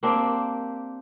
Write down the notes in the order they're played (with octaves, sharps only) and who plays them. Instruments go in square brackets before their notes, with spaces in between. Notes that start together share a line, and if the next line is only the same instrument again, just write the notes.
[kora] A#3 C4 D4 G4